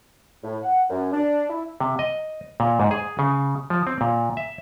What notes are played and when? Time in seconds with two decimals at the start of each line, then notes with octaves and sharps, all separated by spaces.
0.44 A2
0.62 F#5
0.90 F#2
1.12 D4
1.49 E4
1.80 C3
1.99 D#5
2.60 A#2
2.80 G#2
2.91 G#4
3.19 C#3
3.70 F3
3.87 C4
4.01 A#2
4.37 E5